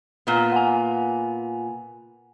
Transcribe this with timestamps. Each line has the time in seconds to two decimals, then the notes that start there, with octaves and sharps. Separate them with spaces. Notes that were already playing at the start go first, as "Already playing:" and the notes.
0.27 A#2 B3
0.52 F#5 G#5